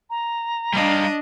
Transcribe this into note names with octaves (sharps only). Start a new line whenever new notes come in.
A#5
G3 D4 D#5 F5